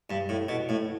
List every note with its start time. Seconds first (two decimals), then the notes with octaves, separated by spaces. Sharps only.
0.10 G2
0.29 A2
0.48 B2
0.69 A2